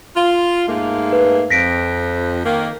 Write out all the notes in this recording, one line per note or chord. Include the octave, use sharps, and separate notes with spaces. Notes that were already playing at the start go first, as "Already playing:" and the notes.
F4
G#2 A3 A#3
B4
F2 A#6 B6 D7
D#3 A#3